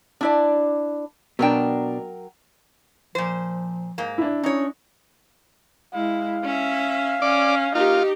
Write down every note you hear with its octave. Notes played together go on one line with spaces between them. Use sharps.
D4 E4 D5
B2 F#3 D4 A#4 G5
A#2 F3 C5
G#2 A#3
D4 E4
C#4 D#4 C#5
G#3 E4 F5
C#4 E5
C#4 D5
A#3 D#4 F4 G4